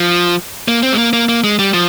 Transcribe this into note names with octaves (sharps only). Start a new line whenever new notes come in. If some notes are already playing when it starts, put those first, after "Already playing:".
Already playing: F3
A#3
C4
G#3
A#3
A#3
A#3
G#3
G3
F3